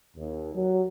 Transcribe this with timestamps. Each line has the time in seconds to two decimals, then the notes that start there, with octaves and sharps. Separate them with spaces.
0.17 D#2
0.56 F#3